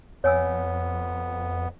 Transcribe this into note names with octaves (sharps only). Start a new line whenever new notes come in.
F2 B3 C#5 G#5 E6